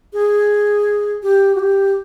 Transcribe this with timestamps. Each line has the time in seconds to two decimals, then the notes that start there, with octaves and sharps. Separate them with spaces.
0.13 G#4
1.23 G4
1.55 F#4
1.59 G4